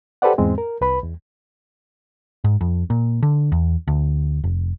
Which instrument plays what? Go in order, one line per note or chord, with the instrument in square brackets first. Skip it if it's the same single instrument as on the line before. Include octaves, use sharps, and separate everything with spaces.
[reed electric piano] G4 A4 B4 C5 D5 F#5
E2 G#2 G#3 C4
A#4
C2 B4 B5
E2
[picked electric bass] G#2
F2
A#2
D3
E2
D2
F1